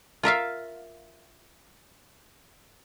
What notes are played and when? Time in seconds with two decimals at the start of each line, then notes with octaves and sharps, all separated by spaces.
0.23 F4 A#4 E5 F5